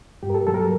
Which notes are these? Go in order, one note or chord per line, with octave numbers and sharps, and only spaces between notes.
G2 G4
A#4
A4
F#3 A4
A#4
A4